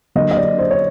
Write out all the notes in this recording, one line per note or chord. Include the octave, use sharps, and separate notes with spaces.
D3 F#3 A#3 D#5
D#5
D5
C5
C#5